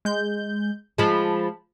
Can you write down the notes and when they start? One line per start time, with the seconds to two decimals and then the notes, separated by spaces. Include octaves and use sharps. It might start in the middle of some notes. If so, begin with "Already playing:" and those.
0.05 G#3 G6
0.98 F3 G#3 A5 B5